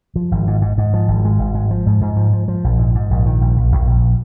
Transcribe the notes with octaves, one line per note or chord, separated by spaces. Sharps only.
F3
G#1
G#2
G#2
G#2
F3
G#1
G#3
G#1
G#3
F3
G#2
G#2
F3
F3
F3
A#1
G#2
G#2
A#1
D#3
A#1
A#1
A#1
A#1